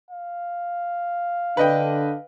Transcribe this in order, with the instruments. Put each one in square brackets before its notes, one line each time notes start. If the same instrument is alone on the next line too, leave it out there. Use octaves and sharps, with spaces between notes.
[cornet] F5
[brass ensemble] D3 D4 [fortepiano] B4 D#5 G5